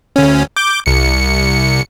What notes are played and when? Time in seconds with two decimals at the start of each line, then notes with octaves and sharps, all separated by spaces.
0.16 D2 C#4
0.56 D6 G6
0.86 C2 C#7